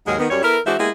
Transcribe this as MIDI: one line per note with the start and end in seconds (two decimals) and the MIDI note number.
0.07 0.15 39
0.07 0.15 44
0.07 0.15 54
0.07 0.15 56
0.07 0.15 68
0.07 0.15 70
0.19 0.29 51
0.19 0.29 59
0.30 0.41 42
0.30 0.41 55
0.30 0.41 73
0.43 0.58 59
0.43 0.58 64
0.43 0.58 69
0.43 0.58 70
0.65 0.75 52
0.65 0.75 56
0.65 0.75 62
0.65 0.75 66
0.65 0.75 72
0.65 0.75 76
0.79 0.90 56
0.79 0.90 58
0.79 0.90 59
0.79 0.90 64
0.79 0.90 67
0.79 0.90 68